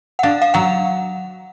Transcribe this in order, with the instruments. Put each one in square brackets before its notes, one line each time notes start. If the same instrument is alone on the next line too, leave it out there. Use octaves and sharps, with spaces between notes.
[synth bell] F#5
[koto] D4 [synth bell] F5
[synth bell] F5
[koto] F#3 [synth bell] F#5